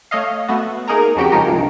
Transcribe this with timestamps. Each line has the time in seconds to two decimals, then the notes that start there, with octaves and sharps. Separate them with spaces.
0.11 A3 C#5 D#5 F5
0.48 A3 B3 F#4
0.87 A#3 D#4 G#4 A#4 G#5 A#5
1.16 F2 C#3 F#4 G4 G5
1.32 C#3 F3 G#3 D#4 G4 A#4
1.48 C2 G2